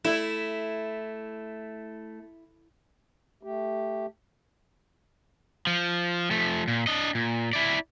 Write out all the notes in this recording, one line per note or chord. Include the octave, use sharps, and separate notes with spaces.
A3 E4
A3 G4
F3
F3 A3
A#2
D4 D#5
A#2
E4 D5